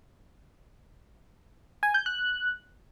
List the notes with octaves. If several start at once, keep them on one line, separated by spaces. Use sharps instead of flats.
G#5
G6
F#6